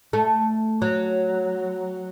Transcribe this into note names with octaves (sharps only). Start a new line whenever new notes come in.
A3
F#3